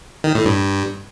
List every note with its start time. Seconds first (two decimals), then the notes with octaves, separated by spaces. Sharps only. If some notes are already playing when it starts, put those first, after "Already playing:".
0.24 D#3
0.35 A2
0.45 G2